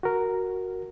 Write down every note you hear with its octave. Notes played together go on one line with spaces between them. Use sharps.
F#4 A#4